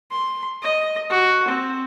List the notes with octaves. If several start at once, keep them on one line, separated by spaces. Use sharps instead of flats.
C6
D#5
F#4
C4